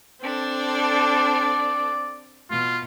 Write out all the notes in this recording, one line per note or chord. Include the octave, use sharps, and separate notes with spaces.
C4 D4 A4
D5
B2 F4